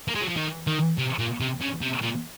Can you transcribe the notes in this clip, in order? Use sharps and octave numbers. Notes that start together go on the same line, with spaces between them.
A#3
G#3
F#3
F3
D#3
D#3
C3
A#2
C3
C#3
C3
A#2